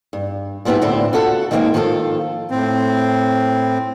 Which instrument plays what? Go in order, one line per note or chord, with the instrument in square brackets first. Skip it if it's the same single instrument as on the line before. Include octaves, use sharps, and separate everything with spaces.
[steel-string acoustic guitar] G2
G#2 F3 B3 C4 E4 G4
D2 A2 D3 C4 E4 C5
F4 F#4 A4 D#5 F#5
D#3 G3 G#3 A#3 C4 C#4
D#3 F3 F4 G#4 A4
[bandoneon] A2 C4